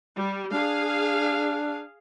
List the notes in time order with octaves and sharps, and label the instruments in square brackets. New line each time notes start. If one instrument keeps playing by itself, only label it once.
[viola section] G3
[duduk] D4 [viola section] G#4 F5